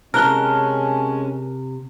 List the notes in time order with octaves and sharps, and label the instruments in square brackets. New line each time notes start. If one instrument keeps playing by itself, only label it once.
[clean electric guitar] C3 A5 [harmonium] G#3 C#4 [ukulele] A#4 [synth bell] F6 F#6 G7